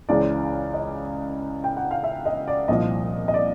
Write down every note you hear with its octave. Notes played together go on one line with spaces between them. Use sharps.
C#2 C#3 E3 D5
D#5
G5
F#5
F5
E5
D#5
D5
C2 A#2 F3 D#5
D#5
D5